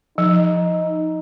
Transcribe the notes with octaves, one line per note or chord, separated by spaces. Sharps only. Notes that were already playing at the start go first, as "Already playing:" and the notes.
F3 D#4